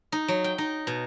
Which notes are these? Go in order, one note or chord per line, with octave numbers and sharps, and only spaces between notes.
D#4
F#3
G5
D#4
B2